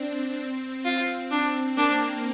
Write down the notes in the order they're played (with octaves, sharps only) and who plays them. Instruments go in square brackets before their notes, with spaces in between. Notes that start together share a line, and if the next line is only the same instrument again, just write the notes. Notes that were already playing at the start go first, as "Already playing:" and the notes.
Already playing: [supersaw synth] C4 D4
C4
[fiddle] F4
[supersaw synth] C4 [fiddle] D4
[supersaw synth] A#3 [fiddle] D4